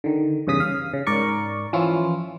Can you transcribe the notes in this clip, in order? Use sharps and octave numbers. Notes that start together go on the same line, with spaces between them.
D3 D#3
E2 G2 C#3 D#6 B6
F5
C#3
G#2 A#4 D5 C#6
E3 F3 C#4 E4 F4